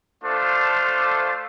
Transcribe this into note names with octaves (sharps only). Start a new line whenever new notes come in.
A3 D4 F4 A4 C5